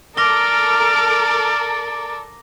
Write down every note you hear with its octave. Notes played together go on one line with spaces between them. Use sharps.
A4 A#4 D5 D6 F6 A#6 D7 G7